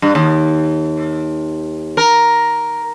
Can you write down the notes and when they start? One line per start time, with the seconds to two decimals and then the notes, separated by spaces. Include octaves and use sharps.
0.02 G2
0.15 D#2
1.97 A#4